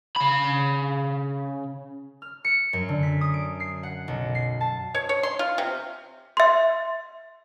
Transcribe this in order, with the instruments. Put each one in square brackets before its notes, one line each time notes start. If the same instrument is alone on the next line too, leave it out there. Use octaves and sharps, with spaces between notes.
[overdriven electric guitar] C#3 B5
[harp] F6
C#7
F#2
D3
B6
D#6
D7
C7
F#5
B1
C7
A5
[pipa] C#5
C#5
C6
F4
C3
[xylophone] E5 C6